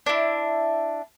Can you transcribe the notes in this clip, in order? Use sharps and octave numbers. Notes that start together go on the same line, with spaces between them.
D4 E4